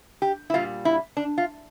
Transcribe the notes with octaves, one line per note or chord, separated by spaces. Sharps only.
G4
E4
A#2 G3 F4
E4
D4
F4